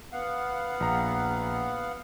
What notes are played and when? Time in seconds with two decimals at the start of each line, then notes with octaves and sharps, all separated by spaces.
0.12 B3 F5 F#5
0.80 A#1 A#5